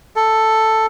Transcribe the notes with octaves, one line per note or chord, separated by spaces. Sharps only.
A4